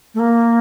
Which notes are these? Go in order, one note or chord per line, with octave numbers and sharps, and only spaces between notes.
A3
A#3